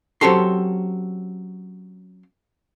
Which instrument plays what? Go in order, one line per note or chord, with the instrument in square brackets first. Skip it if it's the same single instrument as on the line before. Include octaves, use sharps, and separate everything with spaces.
[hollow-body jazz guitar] F#3 C4 C#4 G4 A4 C6